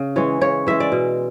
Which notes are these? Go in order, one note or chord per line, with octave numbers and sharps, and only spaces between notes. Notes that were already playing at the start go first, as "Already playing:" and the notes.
Already playing: C#3
E3 G#3 C#5
C#3 C#5
E3 G#3 E5
D5
B2